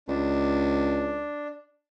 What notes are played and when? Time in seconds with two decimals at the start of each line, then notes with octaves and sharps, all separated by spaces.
0.08 C#2 D4